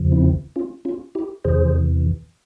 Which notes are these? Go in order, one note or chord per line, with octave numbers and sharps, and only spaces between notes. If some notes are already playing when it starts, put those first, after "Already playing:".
Already playing: E2 C#3 F3
C4 E4
C#4 F4
C#4 F4
E4 G4
E2 C3 E3 G#4 C5